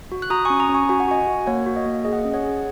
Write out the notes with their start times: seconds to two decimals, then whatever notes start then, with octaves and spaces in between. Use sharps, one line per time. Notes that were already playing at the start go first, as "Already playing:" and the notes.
0.12 F#4
0.22 F#6
0.30 F#4 A#5 D#6
0.45 G#5 C#6
0.50 C#4
0.60 A#5 D#6
0.69 C#4
0.74 G#5 C#6
0.89 F#4 G#5
1.00 F#5
1.08 F#4 D#5 G#5
1.27 F#4
1.47 A#3 C#5 F#5
1.66 F#4
1.76 D#5
1.86 A#3
2.05 G#4 D#5
2.13 F#5
2.20 D#5
2.25 C#4
2.34 C#5 F#5
2.44 G#4